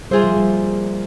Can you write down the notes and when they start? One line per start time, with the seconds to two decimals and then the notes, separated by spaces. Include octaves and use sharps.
0.11 G3 A#3 F4 G#4 C5 E5
0.24 F3
0.36 G3